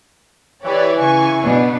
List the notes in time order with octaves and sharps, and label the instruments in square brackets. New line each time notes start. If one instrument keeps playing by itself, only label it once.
[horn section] E3 [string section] G4 C#5 D5
[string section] C#3 G#5 C#6
[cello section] B2 B3 D4